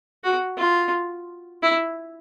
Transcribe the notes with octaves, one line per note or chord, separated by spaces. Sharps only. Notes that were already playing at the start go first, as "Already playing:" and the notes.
F#4
F4
E4